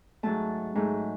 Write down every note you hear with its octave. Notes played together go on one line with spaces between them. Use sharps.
G#2 F#3 A3 A5
G#2 F#3 A3